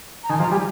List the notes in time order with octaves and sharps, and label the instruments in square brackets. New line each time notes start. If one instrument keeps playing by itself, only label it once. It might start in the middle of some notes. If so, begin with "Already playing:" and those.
[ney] A#5
[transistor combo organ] D#3 [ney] G#5
[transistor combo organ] F3 [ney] A#5
[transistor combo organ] G3 [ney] G#5